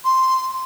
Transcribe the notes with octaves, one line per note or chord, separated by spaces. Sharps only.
C6